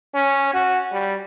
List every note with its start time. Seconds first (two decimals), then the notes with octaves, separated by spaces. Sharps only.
0.15 C#4
0.54 F#4
0.92 G3